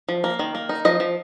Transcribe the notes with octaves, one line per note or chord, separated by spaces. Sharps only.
F3
A#3
D#3
A#3
D#4
F3 D#5
F3